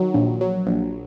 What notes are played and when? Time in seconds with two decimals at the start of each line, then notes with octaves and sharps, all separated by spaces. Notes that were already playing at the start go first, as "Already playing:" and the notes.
Already playing: D#3 F#3
0.14 A#1
0.41 F#3
0.67 A#1